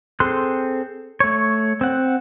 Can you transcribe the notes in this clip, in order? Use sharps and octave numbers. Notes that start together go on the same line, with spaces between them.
C4 G#4 A4 C6 F#6
A3 C#5
C4 F#5